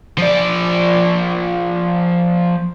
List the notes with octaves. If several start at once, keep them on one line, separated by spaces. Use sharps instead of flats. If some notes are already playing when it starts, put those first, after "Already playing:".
F3 D5